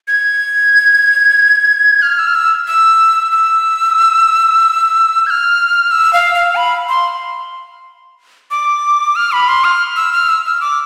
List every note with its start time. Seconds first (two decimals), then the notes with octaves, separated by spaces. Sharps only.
0.08 G#6
2.02 F6
2.19 E6
2.27 F6
2.35 E6
2.67 E6
3.32 E6
5.26 G#6
5.30 F6
5.91 E6
6.13 F5
6.35 F5
6.56 B5
6.89 C6
8.51 D6
9.16 F6
9.32 B5
9.48 C6
9.64 F6
9.96 E6
10.13 F6
10.29 E6
10.45 E6
10.61 D6